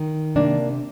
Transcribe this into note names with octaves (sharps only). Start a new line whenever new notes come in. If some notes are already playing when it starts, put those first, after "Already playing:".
Already playing: D#3
C3 A#3 D4